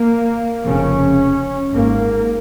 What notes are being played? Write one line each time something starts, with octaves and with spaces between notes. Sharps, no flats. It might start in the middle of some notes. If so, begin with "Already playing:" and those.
Already playing: A#3
F1 F2 C#3 C#4
G#1 G#2 A#3